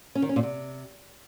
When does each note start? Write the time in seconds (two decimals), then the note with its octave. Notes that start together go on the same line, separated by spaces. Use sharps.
0.15 C#4
0.22 D#3
0.29 C#4
0.36 A#2
0.43 C3